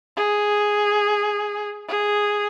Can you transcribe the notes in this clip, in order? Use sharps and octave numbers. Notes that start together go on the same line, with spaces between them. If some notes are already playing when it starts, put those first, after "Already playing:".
G#4
G#4